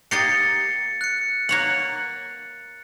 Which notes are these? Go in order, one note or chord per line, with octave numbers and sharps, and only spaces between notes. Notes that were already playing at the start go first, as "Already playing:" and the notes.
A#3 G4 D#5 A6 C7 C#7
F#6 C#7
A#3 C#5 F#5